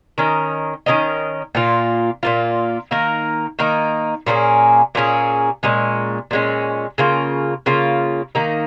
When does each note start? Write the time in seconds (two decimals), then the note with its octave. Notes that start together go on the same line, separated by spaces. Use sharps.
0.18 D#3 C#4 A#4 D#5
0.86 D#3 C#4 A#4 D#5
1.55 A#2 A#3 F4
2.23 A#2 A#3 F4
2.91 D#3 A#3 D#4 A#4
3.59 D#3 A#3 D#4 A#4
4.27 A#2 A#3 C#4 G#4
4.95 A#2 A#3 C#4 G#4
5.63 A#2 G#3 C#4
6.31 A#2 G#3 C#4
6.98 C#3 A#3 F4
7.66 C#3 A#3 F4
8.35 D#3 A#3 D#4